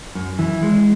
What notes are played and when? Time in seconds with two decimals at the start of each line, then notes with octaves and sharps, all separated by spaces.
0.15 F#2
0.39 E3
0.63 G#3